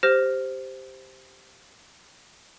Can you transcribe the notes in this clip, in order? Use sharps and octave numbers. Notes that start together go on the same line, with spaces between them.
G4 C5 F6 A#6 E7